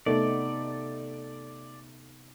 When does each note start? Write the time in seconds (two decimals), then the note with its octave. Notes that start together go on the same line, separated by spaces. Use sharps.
0.06 C3 A3 B3 D#4 D5